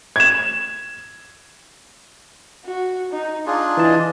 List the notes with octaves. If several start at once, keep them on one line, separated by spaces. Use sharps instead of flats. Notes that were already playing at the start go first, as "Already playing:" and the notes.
G#6 E7
F#4
D#4
D4 D#4 F4 G#4
E3 D#5 A5